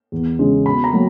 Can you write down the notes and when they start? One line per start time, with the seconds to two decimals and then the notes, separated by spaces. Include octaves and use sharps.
0.12 E2
0.39 C#3 G#3 C#4
0.66 B2 B5
0.84 A#5
0.93 F#3 A#3